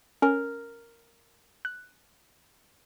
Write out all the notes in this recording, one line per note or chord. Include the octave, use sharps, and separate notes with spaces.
C#4 A#4
F#6